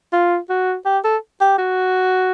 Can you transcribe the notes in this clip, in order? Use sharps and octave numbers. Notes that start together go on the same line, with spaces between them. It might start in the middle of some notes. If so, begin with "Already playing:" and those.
F4
F#4
G4
A4
G4
F#4